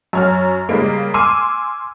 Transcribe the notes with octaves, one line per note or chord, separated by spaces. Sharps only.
F#2 C#5 F6
C#3 G3 G#3 A#3
G#5 C6 D6 E6 F6 D#7